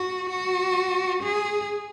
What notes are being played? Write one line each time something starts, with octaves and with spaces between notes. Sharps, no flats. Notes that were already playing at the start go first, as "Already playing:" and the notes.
Already playing: F#4
F#4
G#4